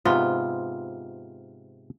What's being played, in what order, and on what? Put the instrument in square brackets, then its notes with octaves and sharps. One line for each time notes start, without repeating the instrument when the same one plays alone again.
[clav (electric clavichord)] G#2 C3 B3 [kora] F4